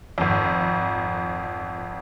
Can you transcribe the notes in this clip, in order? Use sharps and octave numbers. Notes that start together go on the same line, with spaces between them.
G#1 F2